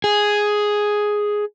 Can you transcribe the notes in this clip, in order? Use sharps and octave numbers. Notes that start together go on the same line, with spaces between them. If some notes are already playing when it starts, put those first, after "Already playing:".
G#4